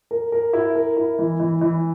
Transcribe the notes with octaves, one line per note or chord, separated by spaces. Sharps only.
A#4
A#4
E4
A#4
E4
E3
E3
E3